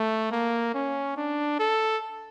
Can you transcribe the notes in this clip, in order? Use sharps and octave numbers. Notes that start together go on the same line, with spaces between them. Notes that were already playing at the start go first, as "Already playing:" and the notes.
Already playing: A3
A#3
C#4
D4
A4